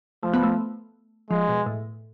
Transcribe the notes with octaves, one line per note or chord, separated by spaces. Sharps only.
F3 A3
B3
A3
F3 G#3
B2
A2